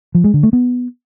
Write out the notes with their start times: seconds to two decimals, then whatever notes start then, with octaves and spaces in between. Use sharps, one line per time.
0.15 F3
0.24 G#3
0.34 D3
0.43 A3
0.53 B3